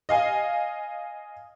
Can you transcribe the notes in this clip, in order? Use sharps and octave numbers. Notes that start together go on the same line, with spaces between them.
D#5 F5 G#5